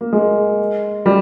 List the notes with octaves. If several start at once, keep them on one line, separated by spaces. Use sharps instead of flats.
A#3
G#3
G3